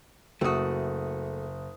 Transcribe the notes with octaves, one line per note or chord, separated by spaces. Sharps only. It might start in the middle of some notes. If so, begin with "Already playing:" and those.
F#1 A3 F#4 D#6